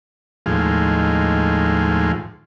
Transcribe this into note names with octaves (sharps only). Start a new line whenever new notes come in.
D#2 A2 F3 G#3